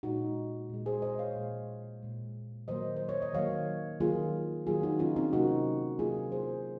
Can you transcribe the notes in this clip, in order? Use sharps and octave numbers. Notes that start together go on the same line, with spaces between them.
A#2 G#3 D#4 F#4
A#2 G#3
G#4 C5
C5 D#5
C#5 F5
A#2 G#3
A#2 G#3
D#3 F#3 A#3 C5 D#5
C5
C#5
D#5
D#3 F#3 A#3 C#5 F5
D#3 F#3 A#3 F4 G#4
D#3 F#3 A#3 F4 G#4
D#4 F#4
C#4 F4
C4 D#4
C3 F#3 A#3 D#4 F#4
C3 F#3 A#3 F4 G#4
G#4 C5